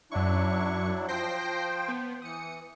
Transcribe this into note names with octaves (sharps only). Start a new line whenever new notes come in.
F#2 F#3 D4 E4 C#6
F3 C5 G5 G6 A#6 C7
B3
E3 D#6 C#7